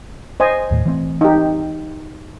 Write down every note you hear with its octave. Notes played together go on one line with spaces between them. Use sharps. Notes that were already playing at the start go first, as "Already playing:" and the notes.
C5 D#5 G#5
D#2 A2
E3 A3 C4
D#4 G4